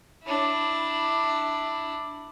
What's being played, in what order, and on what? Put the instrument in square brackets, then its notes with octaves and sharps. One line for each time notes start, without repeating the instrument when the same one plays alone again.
[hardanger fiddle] D4 E4